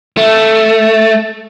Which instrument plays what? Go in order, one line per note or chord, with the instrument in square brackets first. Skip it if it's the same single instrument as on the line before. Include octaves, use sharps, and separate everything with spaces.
[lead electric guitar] A3